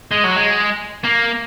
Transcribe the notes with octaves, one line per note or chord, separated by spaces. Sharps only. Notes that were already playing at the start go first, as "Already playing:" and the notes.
G#3
F#3
G#3
A#3